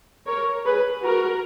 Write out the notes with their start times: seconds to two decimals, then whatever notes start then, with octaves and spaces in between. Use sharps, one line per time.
0.26 A#4 C#5
0.65 G#4 B4
1.03 F#4 A#4